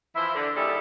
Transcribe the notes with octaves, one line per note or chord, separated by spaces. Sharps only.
E3 F3 E4 C5 E5
D3
D#2 D#3 G3 E4 G#4 A4